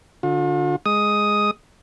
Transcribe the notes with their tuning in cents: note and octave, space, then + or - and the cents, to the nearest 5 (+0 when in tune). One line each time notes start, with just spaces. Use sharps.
D3 +0 F4 +45
G#3 +0 D#6 +5